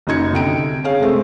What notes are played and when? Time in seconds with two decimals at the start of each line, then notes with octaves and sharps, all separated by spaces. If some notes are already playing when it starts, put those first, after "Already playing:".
0.07 F#1 F#2 D#4 G#6 C#7
0.32 C2 D3 G5 D7
0.84 C#4 G#4 F5
1.00 C3 G#3 A3 C4